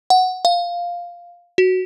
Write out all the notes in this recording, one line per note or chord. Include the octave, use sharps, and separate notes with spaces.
F#5
F5
F#4